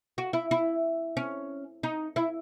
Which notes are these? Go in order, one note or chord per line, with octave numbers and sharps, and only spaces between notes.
F#4
E4
E4
C#4
D#4
E4